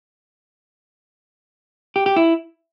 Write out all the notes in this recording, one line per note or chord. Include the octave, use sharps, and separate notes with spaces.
G4
G4
E4